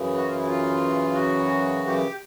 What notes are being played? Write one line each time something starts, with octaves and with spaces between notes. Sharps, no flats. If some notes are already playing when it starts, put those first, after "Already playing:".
Already playing: F#2 C#3 E3
F#4
F4
E4
F4
F#4
G4